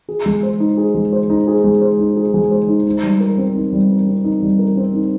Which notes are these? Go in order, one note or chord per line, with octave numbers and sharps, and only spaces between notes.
G#4
G#3
C5
D#4
G#4
G#3
C5
D#4
G#4
G#3
C5
D#4
G#4
G#3
C5
D#4
D#4
G3
A#4
C4
D#4
G3
A#4
C4
D#4
G3
A#4
C4
D#4